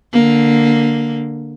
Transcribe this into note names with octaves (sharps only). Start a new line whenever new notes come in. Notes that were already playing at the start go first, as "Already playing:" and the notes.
D3 A#3